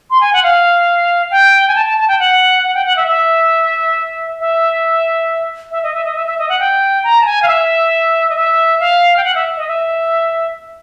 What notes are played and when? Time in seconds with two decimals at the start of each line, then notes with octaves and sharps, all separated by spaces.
0.10 C6
0.21 G#5
0.33 F#5
0.43 F5
1.31 G5
1.68 G#5
1.75 A5
1.86 A5
1.98 A5
2.08 G5
2.19 F#5
2.64 F#5
2.74 G5
2.85 F#5
2.97 E5
3.08 E5
4.40 E5
5.71 E5
5.83 D#5
5.94 E5
6.05 D#5
6.16 E5
6.27 E5
6.38 D#5
6.49 F#5
6.60 G5
7.04 A#5
7.21 A5
7.26 G#5
7.43 F5
7.48 E5
8.30 D#5
8.36 E5
8.80 F5
9.17 G5
9.24 F#5
9.35 E5
9.57 D#5
9.68 E5